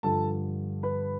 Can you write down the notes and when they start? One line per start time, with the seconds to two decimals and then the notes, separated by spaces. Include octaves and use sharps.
0.03 G2 D3 F3 A4 A5
0.83 B4 B5